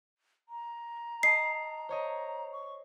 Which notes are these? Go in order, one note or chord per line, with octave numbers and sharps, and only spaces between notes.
A#5
D#5 A5 C7
C5 C#5 D#5
C#6